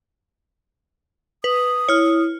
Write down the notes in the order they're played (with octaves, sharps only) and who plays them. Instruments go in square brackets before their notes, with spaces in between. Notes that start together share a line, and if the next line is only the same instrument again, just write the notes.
[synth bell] B4 [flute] D#6
[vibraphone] E4 [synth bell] C#5 F6